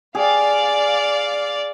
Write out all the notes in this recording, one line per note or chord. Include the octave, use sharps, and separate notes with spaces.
G#4 D5 F5